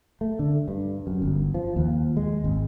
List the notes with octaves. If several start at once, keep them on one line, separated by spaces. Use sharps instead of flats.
A3
D3
G2
F#2
G1
F3
D#2
G#3
G#1